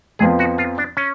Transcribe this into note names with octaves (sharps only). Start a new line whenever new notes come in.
F2 F3 B3 G#4
F#4
F4
D4
C#4